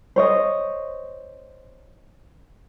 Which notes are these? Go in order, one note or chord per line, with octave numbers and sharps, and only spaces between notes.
C5 C#5 D#5